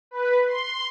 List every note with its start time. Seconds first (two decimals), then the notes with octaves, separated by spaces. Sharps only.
0.11 B4
0.47 C6